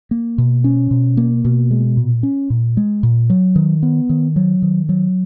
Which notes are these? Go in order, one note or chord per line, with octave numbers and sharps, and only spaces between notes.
A#3
B2
C#4
B2
A#3
B2
G#3
A#2
C#4
A#2
G#3
A#2
F#3
D#3
B3
D#3
F#3
D#3
F#3